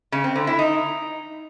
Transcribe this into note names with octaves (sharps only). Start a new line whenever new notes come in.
C#3
C4
D3
E4
D#4